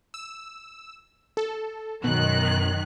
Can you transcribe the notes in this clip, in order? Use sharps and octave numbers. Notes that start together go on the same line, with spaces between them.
E6
A4
F#2 B2 D#3 F#6